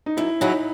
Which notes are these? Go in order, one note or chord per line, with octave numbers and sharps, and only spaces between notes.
D#4
F#2 E4
C#3 F#3 C#4 D#4 E4